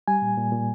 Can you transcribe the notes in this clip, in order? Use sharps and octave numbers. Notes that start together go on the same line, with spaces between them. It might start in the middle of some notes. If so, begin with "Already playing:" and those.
G3 G#5
A#2
A#2
A#2